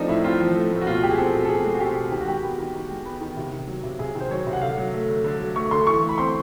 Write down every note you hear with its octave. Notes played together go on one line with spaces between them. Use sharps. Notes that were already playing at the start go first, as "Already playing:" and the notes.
Already playing: F3 A3 C4 D4 D#4
A2 E4
C4 F4
F3
A3
A2
F#4
B2 F4
F#4
G#3 G4
G#4
C4 A4
B2
A4
B2 G#4
G#3
F#4
C4 G4
B2
D#3 G4
F#4
G#3 G4
B3
D#3
D#3
G#3
B3
D#3
C3
D#3
F#3
C3
C3 G#4
D#3
C5
F#3 C#5
C3
F#5
D3 F5
F#3
A3
D3
D3
F#3
A3 C#6
D3 C6
E3 C#6
A3
B5
C4 C6